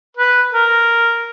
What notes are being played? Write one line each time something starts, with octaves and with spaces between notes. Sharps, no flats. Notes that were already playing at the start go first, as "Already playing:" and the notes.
B4
A#4